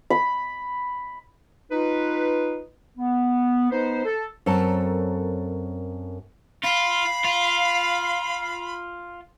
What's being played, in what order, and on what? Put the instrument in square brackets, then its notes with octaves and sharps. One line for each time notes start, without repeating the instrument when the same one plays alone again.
[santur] B5
[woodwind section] D#4 F4 B4
B3
B3 D#4 B4 C5
A4
[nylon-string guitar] F#2 C4 A4 A#4 C#5 A5
[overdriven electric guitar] F4 [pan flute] F5 [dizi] B5
[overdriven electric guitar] F4